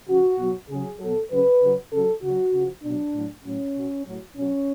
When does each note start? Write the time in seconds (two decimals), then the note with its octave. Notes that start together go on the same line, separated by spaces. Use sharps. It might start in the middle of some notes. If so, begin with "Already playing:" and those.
0.09 C#3 F3 F#4
0.39 B2 F#3
0.70 C#3 F#3 G#4
1.00 B2 F#3 A4
1.31 C#3 F#3 B4
1.61 C#3 F#3
1.92 C#3 F#3 A4
2.23 C#3 F#3 F#4
2.54 C#3 F3
2.84 B2 F#3 D4
3.14 A2 F#3
3.45 A2 F#3 C#4
3.75 B2 F#3
4.06 A2 F#3
4.37 B2 F#3 C#4